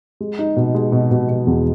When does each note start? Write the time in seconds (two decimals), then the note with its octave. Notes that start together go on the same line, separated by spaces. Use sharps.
0.20 G#3
0.39 D#4
0.56 B2
0.75 G#3
0.92 B2
1.11 B2
1.29 B2
1.47 E2